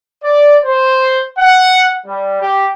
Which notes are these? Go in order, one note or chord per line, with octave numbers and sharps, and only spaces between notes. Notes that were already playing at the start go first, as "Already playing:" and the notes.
D5
C5
F#5
G3
G4